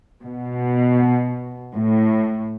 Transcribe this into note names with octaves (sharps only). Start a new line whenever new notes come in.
B2
A2